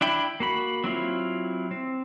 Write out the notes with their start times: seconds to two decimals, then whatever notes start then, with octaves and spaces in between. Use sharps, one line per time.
0.01 D4 E4 G5 B5
0.40 A#3 F#4 B5
0.84 F#3 C4 E4 F4
1.71 C4